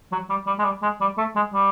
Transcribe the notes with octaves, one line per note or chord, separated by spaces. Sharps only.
F#3
G3
G3
G#3
G3
G#3
G3
A3
G#3
G3